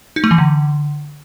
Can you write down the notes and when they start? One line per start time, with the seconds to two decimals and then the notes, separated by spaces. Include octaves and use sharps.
0.16 D#4
0.24 A3
0.31 E3
0.38 D3